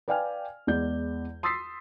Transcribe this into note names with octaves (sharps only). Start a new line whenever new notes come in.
B4 D5 F5 G5 G#5 F6
E2 G#3 D5 G6
C6 D#6 E6 A6 B6 C7